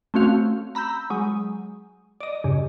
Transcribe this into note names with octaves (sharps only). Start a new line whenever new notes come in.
A3 C4 C#4 F#4 F5
A#5 B5 E6 G6
F#3 G#3
D5 D#5
G2 C#3